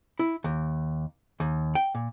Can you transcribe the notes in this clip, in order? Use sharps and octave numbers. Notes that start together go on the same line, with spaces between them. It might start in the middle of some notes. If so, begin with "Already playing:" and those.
E4
D#2
D#2
G5
A#2